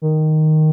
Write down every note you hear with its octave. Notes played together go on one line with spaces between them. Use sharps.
D#3